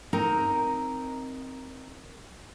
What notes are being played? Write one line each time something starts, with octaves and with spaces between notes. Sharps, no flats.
C4 D#4 A#4 A#5